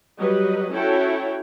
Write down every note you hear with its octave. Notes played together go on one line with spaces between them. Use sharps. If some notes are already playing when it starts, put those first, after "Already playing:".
F#3 G3 B4 D#5
C#4 E4 F#4 A4 C#5 G5